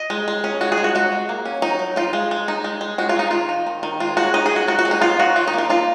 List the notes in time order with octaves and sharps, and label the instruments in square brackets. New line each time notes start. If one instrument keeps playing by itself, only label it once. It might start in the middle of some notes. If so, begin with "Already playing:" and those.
Already playing: [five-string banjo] D#5
G#3
G#3
C#4
G#3 F#4
G#4
G#3
F#4
G#3 F#4
G#3
A#3
C#4
F#3 D#4
F#3
D#4 F4
G#3
G#3
D#4
G#3
G#3
G#3 F#4
F4
G#3 D#4
D#3 F4
D#4
D#3
D#3
G#3 F4
G#3 F#4
D#4 D#5
G#4
G#3 F#4
D#4 F#4
F#4
G#3
D#4
B3 F4
D#4 F#4
D#3 F4
D#4
A#3
F4
D#4 F4